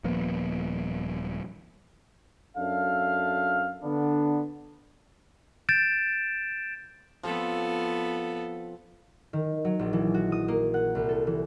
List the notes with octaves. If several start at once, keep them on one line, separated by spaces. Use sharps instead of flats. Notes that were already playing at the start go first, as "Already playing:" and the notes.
D#1 F3 A#3 B3
F#2 D4 F#4 A4 E5 F5
D3 B3 D4
G6 A6 D7 E7
F3 B3 C4 A4
D#3
F#3
A#1
E3
F#4
D#6
A#3
F#5
C2
A4
E3